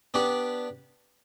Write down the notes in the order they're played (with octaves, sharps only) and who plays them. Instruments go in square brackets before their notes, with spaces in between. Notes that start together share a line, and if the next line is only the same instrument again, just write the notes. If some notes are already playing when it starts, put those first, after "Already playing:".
[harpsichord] B3 D4 G4 D5